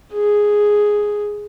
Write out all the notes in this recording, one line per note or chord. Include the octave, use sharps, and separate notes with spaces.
G#4